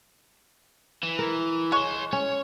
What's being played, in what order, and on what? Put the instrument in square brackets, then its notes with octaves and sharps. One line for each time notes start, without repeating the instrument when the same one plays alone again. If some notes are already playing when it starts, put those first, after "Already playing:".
[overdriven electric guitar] E3
[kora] A#4
[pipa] G#3 C#6 [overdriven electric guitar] C#5 C6
[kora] C#4 [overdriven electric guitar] C#5